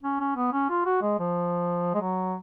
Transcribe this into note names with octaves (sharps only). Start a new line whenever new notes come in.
C#4
C#4
B3
C#4
F4
F#4
G#3
F3
G#3
F#3